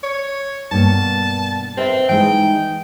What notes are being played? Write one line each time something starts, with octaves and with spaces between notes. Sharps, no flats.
C#5
G2 B2 A#3 A5
C4 A#4 B4 E5
E3 G#3 D#4 G5